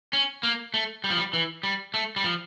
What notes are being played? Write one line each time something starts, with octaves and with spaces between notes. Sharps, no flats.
C#4
A#3
A3
G3
F3
G3
E3
G3
A3
G3
F3